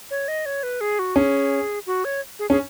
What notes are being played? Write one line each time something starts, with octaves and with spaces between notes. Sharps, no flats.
C#5
D#5
C#5
B4
G#4
F#4
C#4 G#4
F#4
C#5
G#4
C#4 G#4